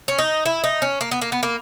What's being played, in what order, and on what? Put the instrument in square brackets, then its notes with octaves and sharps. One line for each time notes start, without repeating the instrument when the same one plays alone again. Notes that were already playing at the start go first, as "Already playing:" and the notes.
[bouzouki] C#4
D#4
E4
D#4
C#4
A#3
B3
A#3
B3
A#3